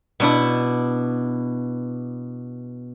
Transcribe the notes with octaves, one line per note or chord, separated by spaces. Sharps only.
B2 D4 E4